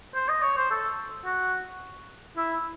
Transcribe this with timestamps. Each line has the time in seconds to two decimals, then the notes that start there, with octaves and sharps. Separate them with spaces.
0.15 C5
0.29 D#5
0.42 C#5
0.57 C5
0.71 A4
1.25 F#4
2.37 E4